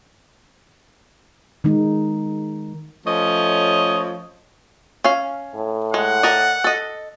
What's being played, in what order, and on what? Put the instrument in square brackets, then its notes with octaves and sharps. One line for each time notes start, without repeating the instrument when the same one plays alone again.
[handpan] D#3 G#3 D#4
[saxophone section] F3 A3 C#4 C#5 D#5
[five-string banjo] C#4 F5
[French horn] A2
[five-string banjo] G#3 [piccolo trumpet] F#5
[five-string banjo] A#4 D5 D#5
A4 D#5